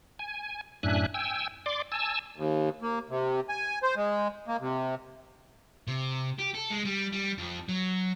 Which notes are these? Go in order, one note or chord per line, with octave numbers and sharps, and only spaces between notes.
G#5
F#2 A2 D4 E5 G#5 F#6
G5 G#5 E6
D5 C6 D6
G#5 A5 E6
D#2
A#3
C3
G#5
C5
G#3
A#3
C3
C3
G4
A4
G#3
G3
G3
F2
F#3